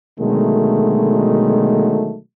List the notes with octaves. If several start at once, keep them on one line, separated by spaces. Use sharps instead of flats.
B2 D3 D#3 F#3 G#3 A3